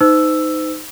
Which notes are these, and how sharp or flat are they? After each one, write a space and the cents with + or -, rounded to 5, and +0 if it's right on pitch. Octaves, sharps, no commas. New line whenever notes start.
D#4 +0 C5 -40 E6 +5